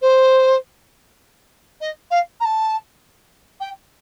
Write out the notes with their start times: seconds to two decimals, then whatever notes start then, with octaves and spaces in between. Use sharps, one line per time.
0.01 C5
1.81 D#5
2.10 F5
2.40 A#5
2.45 A5
3.60 G5